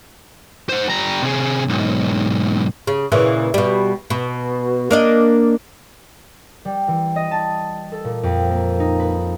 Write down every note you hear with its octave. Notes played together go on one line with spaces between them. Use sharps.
C5 F#5
G3 A#5
C3 G#4
B1 G#2
C#3
A#2 C#3 E3
B2 G3
B2
A#3 D4 D#5
G3
E3
D#5
A5
A4
A#2
F2
A#3
D#4
B4